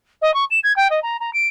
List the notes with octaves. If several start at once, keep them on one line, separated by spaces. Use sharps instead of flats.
D#5
C#6
E7
G#6
G5
D#5
A#5
A#5
D7